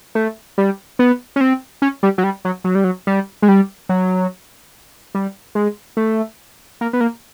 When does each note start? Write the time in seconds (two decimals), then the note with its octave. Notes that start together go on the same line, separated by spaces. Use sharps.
0.15 A3
0.58 G3
0.99 B3
1.36 C#4
1.41 C4
1.82 C#4
2.03 G3
2.18 F#3
2.24 G3
2.45 F#3
2.64 F#3
2.75 G3
2.84 F#3
3.07 G3
3.42 G#3
3.48 G3
3.89 F#3
5.15 G3
5.55 G#3
5.97 A3
6.81 A#3
6.93 B3
7.01 A#3